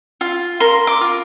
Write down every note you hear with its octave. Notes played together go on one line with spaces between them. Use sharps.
F4
A#4 C6
D6
F4